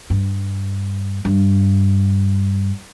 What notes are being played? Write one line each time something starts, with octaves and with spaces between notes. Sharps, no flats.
G2
G2